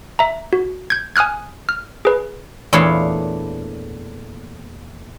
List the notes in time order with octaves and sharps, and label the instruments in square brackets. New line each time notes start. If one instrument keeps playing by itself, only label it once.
[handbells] E5 A#5
F#4
G6 G#6
G#5 D#6 F6 F#6 G#6
F6
G#4 B4
[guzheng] E2 A#2 A3 D4 C#5 F5